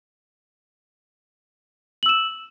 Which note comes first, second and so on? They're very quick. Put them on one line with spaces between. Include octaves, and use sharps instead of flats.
F#7 E6 E7